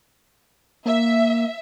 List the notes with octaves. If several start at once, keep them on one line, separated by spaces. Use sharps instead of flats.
A#3 E5